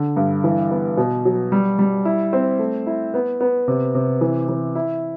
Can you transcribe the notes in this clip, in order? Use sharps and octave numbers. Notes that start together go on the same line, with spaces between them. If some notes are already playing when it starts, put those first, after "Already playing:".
Already playing: D3
G2
E3
B3
B2
F#3
G3
G3
E4
C4
A3
E4
B3
B3
C3
C3
E3
E3
E4